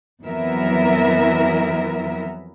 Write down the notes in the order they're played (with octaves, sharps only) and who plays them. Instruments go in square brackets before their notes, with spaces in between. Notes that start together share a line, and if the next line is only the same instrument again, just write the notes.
[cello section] F2 E3 F#3 B3 A#4 E5